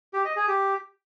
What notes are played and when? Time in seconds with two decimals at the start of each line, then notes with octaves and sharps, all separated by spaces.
0.14 G4
0.25 D#5
0.36 G#4
0.48 G4